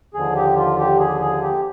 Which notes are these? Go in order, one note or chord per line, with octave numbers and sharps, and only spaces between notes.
D#2 D3 F3 G#4
G4
F4
G4
G#4
G#4
G4